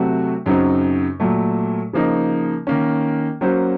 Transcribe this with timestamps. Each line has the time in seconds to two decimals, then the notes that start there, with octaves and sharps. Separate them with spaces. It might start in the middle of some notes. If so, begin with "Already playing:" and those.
Already playing: C3 F#3 A3 C4 F#4
0.46 F#2 C#3 F#3 C4 D#4
1.20 A#2 F#3 A3
1.93 C#3 F3 A#3 D#4
2.67 D#3 A#3 C#4
3.41 F#3 A#3 C#4 F#4 C5